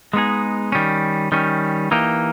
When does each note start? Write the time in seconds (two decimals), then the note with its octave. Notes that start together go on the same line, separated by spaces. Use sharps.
0.13 G#3 B3 D#4 G#4
0.72 D#3 G3 C#4
1.32 D#3 G3 C#4
1.91 E3 A#3 D#4 G4